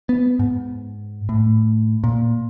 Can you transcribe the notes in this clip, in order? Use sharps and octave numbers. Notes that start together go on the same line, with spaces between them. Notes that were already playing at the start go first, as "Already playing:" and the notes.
B3
G#2
A2
A#2